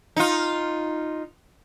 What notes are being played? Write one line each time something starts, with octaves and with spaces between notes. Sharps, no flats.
D#4 F4